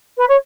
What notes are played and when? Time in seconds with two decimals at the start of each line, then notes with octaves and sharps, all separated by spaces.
0.17 B4
0.28 C#5